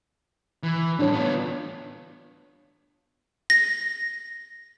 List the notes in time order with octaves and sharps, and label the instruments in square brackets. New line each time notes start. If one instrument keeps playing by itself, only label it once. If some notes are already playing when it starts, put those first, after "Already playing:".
[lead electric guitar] E3
[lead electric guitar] A2 G3 [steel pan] D4 C#5
[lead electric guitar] B3 F4
[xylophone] A#6